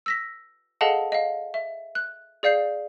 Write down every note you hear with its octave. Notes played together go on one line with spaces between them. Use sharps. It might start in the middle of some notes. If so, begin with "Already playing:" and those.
E6 A#6 B6
G#4 A4 D#5 F5 F#5 A5
D#5 F5
E5
F#6
G#4 D5 F5 G6 C7